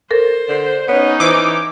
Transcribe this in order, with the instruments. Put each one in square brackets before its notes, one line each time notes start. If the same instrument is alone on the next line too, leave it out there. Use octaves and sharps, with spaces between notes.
[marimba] A4 A#4 [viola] C5
[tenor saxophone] D3
[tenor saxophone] B3 [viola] C#4 D#4 [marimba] C#5
[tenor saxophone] E3 [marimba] E4 C5 C#6 [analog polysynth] D6